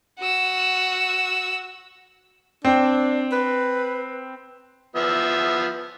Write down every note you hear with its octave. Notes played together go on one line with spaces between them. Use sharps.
F#4 E6
C4 D4
B4
F3 B3 E5